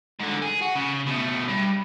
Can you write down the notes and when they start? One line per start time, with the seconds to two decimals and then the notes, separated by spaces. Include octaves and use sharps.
0.19 G#2 D3
0.42 G#4
0.62 F#4
0.75 C#3
1.07 B2 A3
1.48 G2